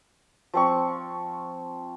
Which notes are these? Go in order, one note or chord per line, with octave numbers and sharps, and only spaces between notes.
F3 C4 C#6